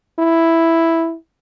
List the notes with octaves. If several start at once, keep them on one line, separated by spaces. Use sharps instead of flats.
E4